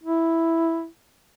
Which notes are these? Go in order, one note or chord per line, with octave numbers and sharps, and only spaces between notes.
E4